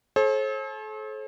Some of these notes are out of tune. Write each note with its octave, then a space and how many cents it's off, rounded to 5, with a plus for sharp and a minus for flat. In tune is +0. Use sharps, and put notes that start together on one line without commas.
A4 -40 C5 +45